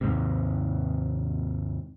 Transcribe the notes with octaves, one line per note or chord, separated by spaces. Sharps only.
D#2 G#2 C3